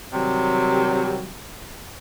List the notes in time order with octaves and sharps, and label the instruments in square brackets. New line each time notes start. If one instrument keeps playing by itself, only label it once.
[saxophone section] C3 D#3 F#3 G3